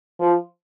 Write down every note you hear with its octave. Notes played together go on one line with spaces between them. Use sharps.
F3